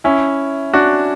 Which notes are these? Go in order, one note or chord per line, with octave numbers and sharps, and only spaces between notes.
C#4 E4
D4 F#4